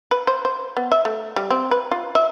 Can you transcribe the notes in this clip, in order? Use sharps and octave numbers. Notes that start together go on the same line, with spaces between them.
B4
C5
C5
B3
E5
A3
G3
C4
B4
F4
E5